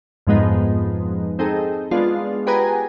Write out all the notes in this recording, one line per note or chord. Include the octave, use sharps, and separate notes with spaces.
F2 G#2 F3 G#3 B3 D#4
C4 D#4 G#4 A4
G#3 B3 D4 F4
G4 G#4 B4 F#5 G#5 A#5